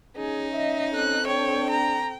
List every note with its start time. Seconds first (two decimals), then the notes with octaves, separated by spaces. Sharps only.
0.17 C#4 D#4 G#4
0.53 D#5 E5
0.95 C4 A4 F#6
1.27 D4 C#5 G5
1.70 A#5